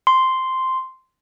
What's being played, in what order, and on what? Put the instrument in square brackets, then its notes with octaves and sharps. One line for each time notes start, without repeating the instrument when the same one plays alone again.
[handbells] C6